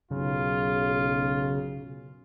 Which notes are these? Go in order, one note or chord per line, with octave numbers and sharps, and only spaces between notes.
B1 F#2 C#3 F4